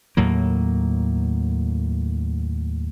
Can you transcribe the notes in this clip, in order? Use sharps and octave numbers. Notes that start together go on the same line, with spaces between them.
D#2 A2 F#3 A#3